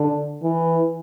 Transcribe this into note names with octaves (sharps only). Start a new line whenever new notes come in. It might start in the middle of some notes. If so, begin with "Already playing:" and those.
Already playing: D3
E3